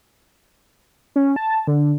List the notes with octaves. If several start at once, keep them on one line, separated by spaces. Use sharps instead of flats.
C#4
A5
D3